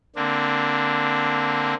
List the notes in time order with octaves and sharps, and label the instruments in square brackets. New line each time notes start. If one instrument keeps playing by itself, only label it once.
[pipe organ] D3 A#3 C4 D4